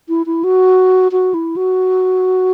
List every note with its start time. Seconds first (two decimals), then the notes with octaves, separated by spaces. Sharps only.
0.09 E4
0.26 E4
0.44 F#4
1.12 F#4
1.34 E4
1.56 F#4